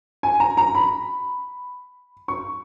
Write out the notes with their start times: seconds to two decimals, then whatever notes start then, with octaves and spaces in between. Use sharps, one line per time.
0.23 G#5
0.40 A#5
0.57 A#5
0.75 B5
2.28 C#6